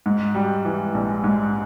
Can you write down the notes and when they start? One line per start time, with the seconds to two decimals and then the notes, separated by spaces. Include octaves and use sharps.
0.06 G#2
0.35 G3
0.65 E3
0.94 A#1
1.24 G#2